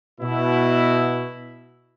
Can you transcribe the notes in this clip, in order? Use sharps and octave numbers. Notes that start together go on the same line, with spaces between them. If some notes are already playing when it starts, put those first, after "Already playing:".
B2 E4